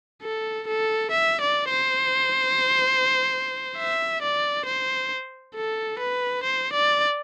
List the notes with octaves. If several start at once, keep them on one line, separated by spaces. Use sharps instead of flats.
A4
A4
E5
D5
C5
E5
D5
C5
A4
B4
C5
D5